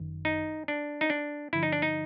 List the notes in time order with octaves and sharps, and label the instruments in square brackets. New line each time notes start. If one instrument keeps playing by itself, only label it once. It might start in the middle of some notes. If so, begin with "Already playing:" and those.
Already playing: [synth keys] G1 F#2 D#3
[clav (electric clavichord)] D#4
D4
D#4
D4
[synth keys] G2 D3 F3 [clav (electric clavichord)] E4
[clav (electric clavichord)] D#4
D4
D#4